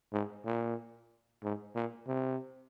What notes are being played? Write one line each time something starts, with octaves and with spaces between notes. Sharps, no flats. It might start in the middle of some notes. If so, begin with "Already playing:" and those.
G#2
A#2
G#2
A#2
C3